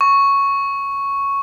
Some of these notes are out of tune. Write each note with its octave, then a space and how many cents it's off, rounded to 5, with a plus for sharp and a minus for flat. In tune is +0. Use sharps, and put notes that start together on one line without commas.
C#6 +0